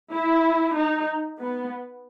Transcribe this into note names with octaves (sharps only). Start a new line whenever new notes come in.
E4
D#4
B3